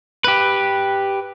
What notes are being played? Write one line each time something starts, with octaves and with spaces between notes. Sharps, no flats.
G4 B4